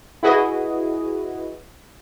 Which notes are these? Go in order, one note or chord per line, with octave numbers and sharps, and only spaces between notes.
E4 F#4 G#4 B4 D#5